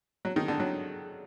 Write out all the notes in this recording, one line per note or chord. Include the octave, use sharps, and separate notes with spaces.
F#3
D#3
D3
F#3